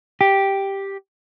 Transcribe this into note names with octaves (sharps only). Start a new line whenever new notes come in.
G4